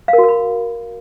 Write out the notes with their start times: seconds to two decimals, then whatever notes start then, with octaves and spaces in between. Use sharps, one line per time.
0.08 F5
0.13 A#4
0.18 F#4
0.23 A#4
0.29 B5